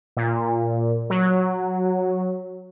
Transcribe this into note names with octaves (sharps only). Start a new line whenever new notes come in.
A#2
F#3